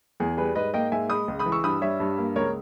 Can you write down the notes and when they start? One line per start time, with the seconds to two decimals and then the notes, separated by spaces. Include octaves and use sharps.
0.20 E2 G#4
0.37 G3 G#4 B4
0.55 G#2 B4 D#5
0.74 A#3 D#5 G5
0.92 G#2 E5 G#5
1.09 G#3 B5 D#6
1.28 C#2
1.39 B5 D#6
1.46 E3
1.52 C#6 E6
1.64 G2 B5 D#6
1.81 G3 C#5 E5
2.00 G2
2.18 A#3
2.35 C#2 A#4 C#5